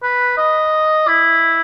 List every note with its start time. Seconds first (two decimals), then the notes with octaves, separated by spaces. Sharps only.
0.03 B4
0.37 D#5
1.07 E4